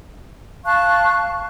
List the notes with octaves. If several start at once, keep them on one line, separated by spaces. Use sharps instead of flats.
F5 A5 C#6 F#6